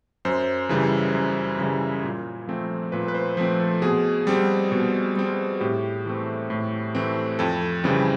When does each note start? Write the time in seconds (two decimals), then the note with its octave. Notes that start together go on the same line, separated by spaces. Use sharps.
0.25 F#2 C5
0.69 C#3 E3 G3
1.15 F#2
1.59 C#3 E3 G3
2.03 A#2
2.47 F3 A3 C4
2.92 A#2 B4
3.08 B4
3.14 C5
3.37 F3 A3 C4 B4
3.60 A4
3.82 B2 G#4
4.27 G3 C4
4.72 B2
5.16 G3 C4
5.61 A2 G4
6.06 E3 A3 C4
6.50 A2
6.95 E3 A3 C4
7.39 F2 A4
7.84 C#3 E3 G3 C4